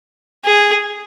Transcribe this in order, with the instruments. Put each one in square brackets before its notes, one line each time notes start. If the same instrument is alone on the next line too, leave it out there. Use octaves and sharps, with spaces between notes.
[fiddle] G#4